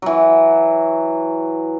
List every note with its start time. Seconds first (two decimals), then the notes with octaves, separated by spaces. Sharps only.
0.02 E3 F#3